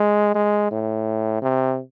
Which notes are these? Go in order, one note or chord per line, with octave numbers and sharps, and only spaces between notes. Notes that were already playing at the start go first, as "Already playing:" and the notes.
Already playing: G#3
G#3
A2
C3